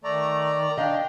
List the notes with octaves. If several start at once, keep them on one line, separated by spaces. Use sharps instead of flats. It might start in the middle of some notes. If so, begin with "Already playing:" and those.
D#3 A3 D5 A#5
D4 D#5 F5 G5